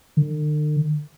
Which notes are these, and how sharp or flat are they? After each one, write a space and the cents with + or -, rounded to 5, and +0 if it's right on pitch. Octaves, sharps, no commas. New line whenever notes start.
D3 +45